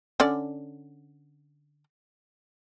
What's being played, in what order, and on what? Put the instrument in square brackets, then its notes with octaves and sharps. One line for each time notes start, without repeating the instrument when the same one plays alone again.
[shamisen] D3 C#4 D5